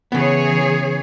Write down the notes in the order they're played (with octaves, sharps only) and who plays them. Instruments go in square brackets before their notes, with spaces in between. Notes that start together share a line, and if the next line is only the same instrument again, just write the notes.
[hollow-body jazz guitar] C#3 B3 [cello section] E3 G#4 C#5